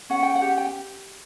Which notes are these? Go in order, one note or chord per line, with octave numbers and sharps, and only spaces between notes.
C#4 F#5
G5
F#5
G4
G5